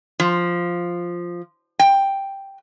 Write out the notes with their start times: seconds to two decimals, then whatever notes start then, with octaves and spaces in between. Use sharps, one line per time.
0.20 F3
1.79 G5